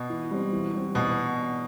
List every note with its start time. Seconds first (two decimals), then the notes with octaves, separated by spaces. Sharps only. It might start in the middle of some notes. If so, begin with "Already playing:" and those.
Already playing: B2
0.10 E3
0.31 G3 C4
0.53 E3
0.74 G3 C4
0.95 E2 B2